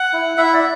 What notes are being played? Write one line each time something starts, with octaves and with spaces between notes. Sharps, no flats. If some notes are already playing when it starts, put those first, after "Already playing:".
Already playing: F#5
E4
E4 E5
D5